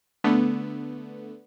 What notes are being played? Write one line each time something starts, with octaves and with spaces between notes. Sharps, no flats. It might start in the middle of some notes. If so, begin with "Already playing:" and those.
D3 A3 B3